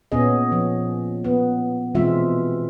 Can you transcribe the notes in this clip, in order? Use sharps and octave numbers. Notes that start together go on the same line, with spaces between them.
A#2 B3 C#4 G#4 D#5
F3
B3
B2 E3 G#3 C4 F4 E5